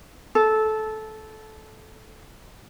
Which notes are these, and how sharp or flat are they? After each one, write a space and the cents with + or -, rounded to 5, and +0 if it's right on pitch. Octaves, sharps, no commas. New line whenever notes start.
A4 -15